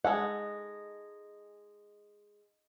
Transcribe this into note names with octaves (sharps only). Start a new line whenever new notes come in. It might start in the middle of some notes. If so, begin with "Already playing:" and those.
G#3 A4 D#5 F#5